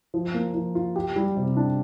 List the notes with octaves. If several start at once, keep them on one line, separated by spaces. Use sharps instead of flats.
F3
A#3
F3
F4
G4
G3
C3
D4